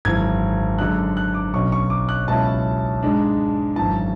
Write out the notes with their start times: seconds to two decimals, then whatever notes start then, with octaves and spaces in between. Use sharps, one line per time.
0.05 G#1 F#2 E3 G#6
0.79 F#2 D3 G#3 D4 F#6
1.17 F#6
1.34 D6
1.54 B1 B2 F#3 C#4 C#6
1.72 C#6
1.90 D6
2.09 F#6
2.28 C#2 B2 F#3 C#4 E4 A5
3.03 G#2 G#3 D4
3.76 G#1 F#2 E3 A5